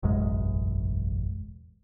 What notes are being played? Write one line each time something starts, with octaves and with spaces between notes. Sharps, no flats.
E1 A1 F#2 G#3